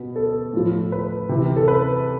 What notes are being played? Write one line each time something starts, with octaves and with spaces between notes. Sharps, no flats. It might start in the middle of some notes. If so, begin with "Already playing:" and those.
Already playing: B2 B4
A4
A2 F3
B4
C3 E3
A4
B4